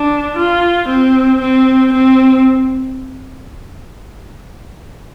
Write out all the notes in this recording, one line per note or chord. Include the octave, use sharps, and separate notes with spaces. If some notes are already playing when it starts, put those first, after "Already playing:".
Already playing: D4
F4
C4
C4
C4